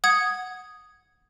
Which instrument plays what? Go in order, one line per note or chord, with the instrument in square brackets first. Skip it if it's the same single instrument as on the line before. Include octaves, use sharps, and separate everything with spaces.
[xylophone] F#5 D#6 G#6